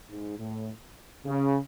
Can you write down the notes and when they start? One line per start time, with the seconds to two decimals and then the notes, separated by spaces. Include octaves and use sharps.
0.09 G#2
0.38 A2
1.25 C#3